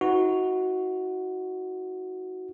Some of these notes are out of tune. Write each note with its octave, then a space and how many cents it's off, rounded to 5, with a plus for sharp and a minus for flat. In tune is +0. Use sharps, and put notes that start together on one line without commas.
D#4 +45 F#4 +0 B4 +0